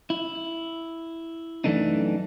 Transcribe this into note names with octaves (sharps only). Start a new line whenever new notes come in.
E4
F#2 E3 A3 D4 D#4